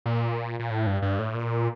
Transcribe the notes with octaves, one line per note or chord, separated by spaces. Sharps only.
A#2
A#2
A2
G2
G2
A2
A#2